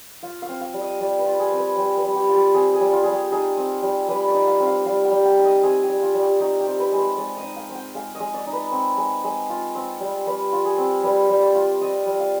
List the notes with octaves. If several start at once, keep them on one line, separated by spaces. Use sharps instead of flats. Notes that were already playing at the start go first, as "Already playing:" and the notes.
F4 F5
F5
C4
F5
G3
D#5
G3 D5
B4
F4
G#4
C4
B4
G3 C5
B4
G3
G4
F4
G4
C4 G#4
G#4
G3
F4
G3 G#4
G4
D#4 G#4
C4
G3
G3 B4
D5
D#4
F5
C4
F5
G3 F5
G5
G3
G5
D#4
D#5
C4 G#4
G4
G3
F4
G3
G4
D#4 G4
G4
C4
B4
G#3
C5
G#3 D5
D#5
D#4
F5
C4
G5
G#3 F5
D#5
G#3
D5
D#4
B4
C4
G#3
G#3
F4
C4
G3
G3 B4
F4
G#4
C4
G3 B4
G3
D5
F4
C4 D#5
G3
F5